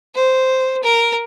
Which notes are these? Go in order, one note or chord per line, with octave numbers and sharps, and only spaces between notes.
C5
A#4